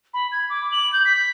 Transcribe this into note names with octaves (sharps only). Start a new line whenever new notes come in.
B5
G#6
D6
F#7
G6
B6